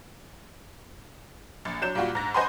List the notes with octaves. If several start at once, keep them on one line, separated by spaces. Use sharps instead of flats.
A#1
F#3 D4 G6 E7
A#2 G3 F4 F#4
G#2 A#6
C5 D#5 F#5 G#5 B5 C6